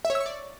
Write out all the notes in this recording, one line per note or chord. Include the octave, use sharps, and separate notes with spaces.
E5
C#5
E6
C#6
D5